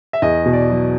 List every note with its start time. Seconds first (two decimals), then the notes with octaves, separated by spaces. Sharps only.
0.13 E5
0.22 E2 D#5
0.45 B2
0.53 D5
0.70 F#3